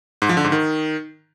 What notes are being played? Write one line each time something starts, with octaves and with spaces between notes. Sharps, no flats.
G#2
F3
D3
G#2
D#3